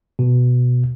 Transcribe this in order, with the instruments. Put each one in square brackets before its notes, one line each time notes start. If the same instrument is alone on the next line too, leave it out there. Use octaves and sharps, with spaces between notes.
[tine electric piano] B2